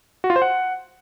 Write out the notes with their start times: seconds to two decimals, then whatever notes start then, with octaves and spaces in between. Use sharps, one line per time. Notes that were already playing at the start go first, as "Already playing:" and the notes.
0.24 F#4
0.30 F4
0.36 C5
0.42 F#5